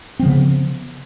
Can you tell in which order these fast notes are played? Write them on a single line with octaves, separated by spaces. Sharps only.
C4 F3 C#3 B3